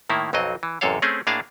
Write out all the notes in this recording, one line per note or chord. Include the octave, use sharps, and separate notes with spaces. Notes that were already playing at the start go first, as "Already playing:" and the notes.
A2 D#3 A#3 E4
B1 F2 F#3 C4 D#5
E3
A1 F#2 C3 A4 C#5 F5
A3 C4 C#4 G#4
A2 A#3 D4 G#4 F5 A5